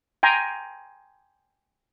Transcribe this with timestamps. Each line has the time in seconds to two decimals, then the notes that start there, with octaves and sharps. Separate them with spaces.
0.23 G5 G#5 A#5 C6